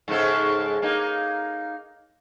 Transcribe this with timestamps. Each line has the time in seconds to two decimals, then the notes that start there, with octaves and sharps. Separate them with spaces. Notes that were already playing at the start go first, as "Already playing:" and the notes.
0.08 G#2 C#3 A4
0.82 A#3 D#4